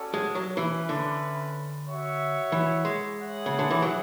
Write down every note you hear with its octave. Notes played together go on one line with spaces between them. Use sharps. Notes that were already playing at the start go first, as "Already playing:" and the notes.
Already playing: C#4 F#4 A4 D5
G#3
F#3
E3 C#4 E4 B4
D3
F#4 C#5 E5
E3
G#3
E4 G#4 C#5 F#5
C#3
D3
E3
F#3